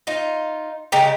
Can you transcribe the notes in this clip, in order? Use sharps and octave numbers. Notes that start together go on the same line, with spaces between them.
D#4 F4
C#3 G#3 G4 A#5